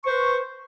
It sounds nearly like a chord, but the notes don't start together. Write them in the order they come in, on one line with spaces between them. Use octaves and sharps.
C#6 C5 B4